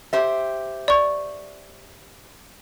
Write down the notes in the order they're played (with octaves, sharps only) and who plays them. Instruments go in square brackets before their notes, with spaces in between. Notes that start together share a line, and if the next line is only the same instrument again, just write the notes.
[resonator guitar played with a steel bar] G4 C5 E5
[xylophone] D5 C#6